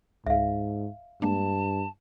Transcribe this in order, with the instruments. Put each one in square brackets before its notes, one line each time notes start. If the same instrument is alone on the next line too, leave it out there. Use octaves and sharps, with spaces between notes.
[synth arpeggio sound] C#2 [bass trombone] G#2 [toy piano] E5 F5
[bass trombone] G2 [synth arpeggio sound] G#3 A#3 D4 [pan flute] A5